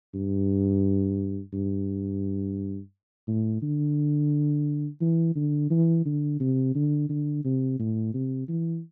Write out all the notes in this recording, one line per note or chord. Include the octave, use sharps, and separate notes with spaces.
G2
G2
A2
D3
E3
D3
E3
D3
C3
D3
D3
C3
A2
C3
E3